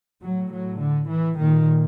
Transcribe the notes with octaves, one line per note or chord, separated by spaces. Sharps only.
A2 F#3
F#3
D3
E3
A#2 D#3